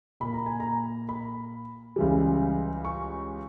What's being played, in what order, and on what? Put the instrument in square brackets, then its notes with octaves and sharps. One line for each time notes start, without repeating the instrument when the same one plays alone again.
[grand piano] A#2 A#3 B5
A#5
G#5
A#5
B5
C#2 C#3 E3 G3
C#6